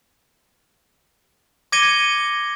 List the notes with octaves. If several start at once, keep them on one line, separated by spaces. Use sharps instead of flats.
D6 G#6 A#6 C#7 D#7 G7